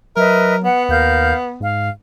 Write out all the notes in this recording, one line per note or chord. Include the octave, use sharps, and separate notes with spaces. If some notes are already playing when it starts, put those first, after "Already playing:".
F#3 A#4 B4 D#5 E5
B3 F#5
D#2 A#4 F5 G6
G#2 F5